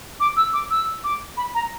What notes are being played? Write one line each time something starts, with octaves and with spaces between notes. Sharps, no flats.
D6
E6
D6
E6
D6
B5
A#5